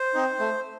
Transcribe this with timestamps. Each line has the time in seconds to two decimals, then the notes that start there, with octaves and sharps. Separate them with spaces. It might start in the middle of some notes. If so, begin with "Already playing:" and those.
Already playing: C5
0.14 C4 D#4
0.39 A3